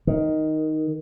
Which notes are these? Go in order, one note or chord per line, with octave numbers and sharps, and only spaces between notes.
D#3